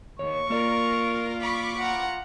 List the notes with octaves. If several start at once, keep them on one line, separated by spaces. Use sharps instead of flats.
D#2 C#5 C#6
A#3 F4 A#4 D5
B5 C#6 D6
F4 F#5 A#5